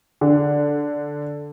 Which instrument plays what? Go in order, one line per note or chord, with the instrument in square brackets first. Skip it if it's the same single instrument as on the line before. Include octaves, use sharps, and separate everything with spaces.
[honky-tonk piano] D3